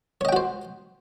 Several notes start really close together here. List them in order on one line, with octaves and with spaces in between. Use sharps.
C#5 D#5 G5 F#4 C5